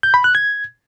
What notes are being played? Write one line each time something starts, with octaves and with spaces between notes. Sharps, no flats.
G6
B5
F#6
G#6